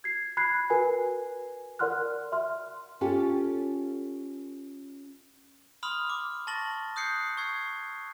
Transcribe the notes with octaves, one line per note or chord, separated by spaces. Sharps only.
G#6 C7
B5 F#6 G#6 C7
F#4 A#4 B4 G#5
A#4 D5 F#5 C6 F6 F#6
E5 C6 F6
C#4 F4 G4 A4
B5 C6 D#6 F6
D6
A5 C#6 A6 A#6 F#7
D#6 F#6 G6 C7 C#7
C#6 E6 G#6 C7